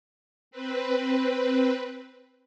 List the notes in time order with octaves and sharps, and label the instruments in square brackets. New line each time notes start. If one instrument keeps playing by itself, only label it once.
[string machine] C4 B4